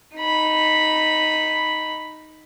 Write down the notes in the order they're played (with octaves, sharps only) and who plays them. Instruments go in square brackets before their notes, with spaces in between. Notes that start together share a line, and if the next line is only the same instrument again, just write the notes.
[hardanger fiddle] D#4 B5